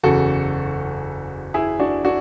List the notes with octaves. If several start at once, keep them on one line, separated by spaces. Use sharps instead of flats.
F#1 E2 C#3 F#4 A4
E4 G#4
D4 F#4
D4 F#4